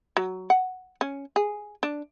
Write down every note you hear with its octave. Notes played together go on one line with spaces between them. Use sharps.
F#3
F#5
C#4
G#4
D4